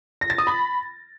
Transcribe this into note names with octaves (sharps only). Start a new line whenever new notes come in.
A#6
A6
D#6
B5